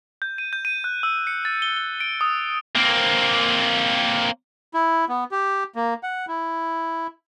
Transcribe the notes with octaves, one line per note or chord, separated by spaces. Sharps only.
G6
D#7
G6
D#7
F#6
E6
C#7
A6
G7
G7
D7
D#6
A#3 C4
E4
B3
G4
A#3
F#5
E4